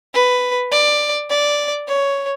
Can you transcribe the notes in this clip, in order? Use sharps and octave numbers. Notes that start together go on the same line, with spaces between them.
B4
D5
D5
C#5